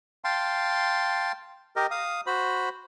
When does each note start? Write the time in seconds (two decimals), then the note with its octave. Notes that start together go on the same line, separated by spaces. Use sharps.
0.24 F5 G5 A5 C6
1.76 G4 A#4 D#5
1.91 F5 D#6
2.27 F#4 C5 B5